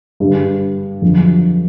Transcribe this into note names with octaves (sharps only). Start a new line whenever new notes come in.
G2 D3 G3
F2 D3 F#3